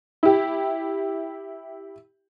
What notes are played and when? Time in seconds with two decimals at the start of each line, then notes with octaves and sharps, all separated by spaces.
0.23 E4 G4